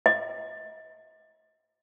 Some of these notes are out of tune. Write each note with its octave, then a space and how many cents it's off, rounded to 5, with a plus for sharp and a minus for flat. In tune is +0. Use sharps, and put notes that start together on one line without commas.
D#5 +40